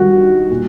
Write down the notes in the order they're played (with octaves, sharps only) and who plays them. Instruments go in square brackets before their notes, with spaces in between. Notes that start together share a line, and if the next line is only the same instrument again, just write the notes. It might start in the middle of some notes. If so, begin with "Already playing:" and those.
Already playing: [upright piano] G2 D#3 G3 F#4
A#2